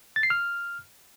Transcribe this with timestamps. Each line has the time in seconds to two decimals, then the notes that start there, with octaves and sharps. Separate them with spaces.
0.16 A6
0.23 C7
0.30 F6